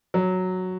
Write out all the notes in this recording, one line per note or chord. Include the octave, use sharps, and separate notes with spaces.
F#3